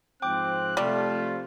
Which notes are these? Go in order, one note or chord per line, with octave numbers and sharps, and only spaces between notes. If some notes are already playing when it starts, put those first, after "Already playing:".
G#2 F3 C4 G5 D6 F#6
C3 F3 G3 A3 F4